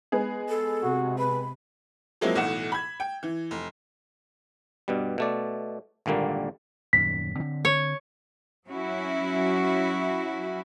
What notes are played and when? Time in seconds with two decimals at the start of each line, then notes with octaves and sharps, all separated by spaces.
0.12 G#3 B3 G#4
0.49 A4
0.83 C3 F#4
1.18 B4 B5
2.21 F3 F#3 G#3 A#3 C4 E4
2.35 B1 A2 E3 F#5 E7
2.72 B5 G#6
3.00 G5
3.23 E3
3.51 F1
4.88 G2 B2 G3
5.18 B2 A3 D5
6.06 G#1 A#2 D3 G3 A#3
6.93 D#1 F#2 D#3 B6
7.36 D3 C4
7.65 C#5
8.69 F#3 C#4 E4 F#4